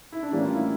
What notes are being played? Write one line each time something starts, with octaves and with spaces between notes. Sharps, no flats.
E4
D4
A2 E3 G3 A#3 C#4
F4
E4